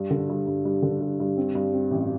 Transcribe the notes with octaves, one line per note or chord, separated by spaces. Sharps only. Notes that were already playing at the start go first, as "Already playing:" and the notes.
Already playing: G2
D3
G2
G2
G2
D3
G2
G2
C4
G2
C4
A1